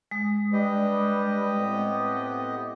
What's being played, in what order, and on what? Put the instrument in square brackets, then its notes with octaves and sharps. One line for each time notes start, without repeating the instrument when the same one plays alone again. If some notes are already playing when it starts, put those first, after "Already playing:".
[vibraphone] G#3 D#6
[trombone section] G3 D4 B4 [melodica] G4 D#5
[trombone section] A2 B3 C4